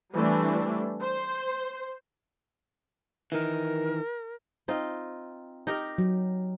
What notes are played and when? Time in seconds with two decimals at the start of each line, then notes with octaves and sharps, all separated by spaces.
0.15 E3 G3 A3 C4 D4
1.02 C5
3.32 D#3 E3 A#4
4.68 C4 D#4 F4
5.67 D#4 G4 A#4
5.98 F#3